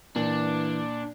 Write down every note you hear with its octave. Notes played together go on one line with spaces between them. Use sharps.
A#2 E3 D4